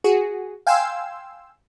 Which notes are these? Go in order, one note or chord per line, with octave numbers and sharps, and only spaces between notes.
F#4 G#4
F5 G5 G#5 C6 E6